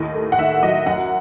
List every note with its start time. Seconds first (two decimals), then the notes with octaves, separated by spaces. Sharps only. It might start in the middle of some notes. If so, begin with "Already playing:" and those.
Already playing: D#2 A2 D#5
0.15 A3
0.32 F#5
0.38 D#3 E5
0.62 F#3 D#5
0.86 F#2 F#5